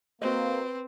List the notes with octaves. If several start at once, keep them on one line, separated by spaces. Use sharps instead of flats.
A#3 C4 F#4 B4 C5 D#5